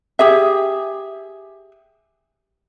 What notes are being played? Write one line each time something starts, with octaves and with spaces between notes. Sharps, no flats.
G4 G#4 E5